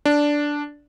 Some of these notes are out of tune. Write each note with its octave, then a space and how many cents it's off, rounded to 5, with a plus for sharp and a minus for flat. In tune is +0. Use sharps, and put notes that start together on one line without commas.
D4 -5